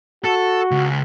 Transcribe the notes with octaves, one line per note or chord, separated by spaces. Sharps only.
F#4 A4
C#2